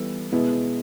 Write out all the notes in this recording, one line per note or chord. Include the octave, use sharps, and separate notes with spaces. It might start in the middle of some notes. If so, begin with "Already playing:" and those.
Already playing: E3 G3 B3 E4 A4
B2 G#3 B3 E4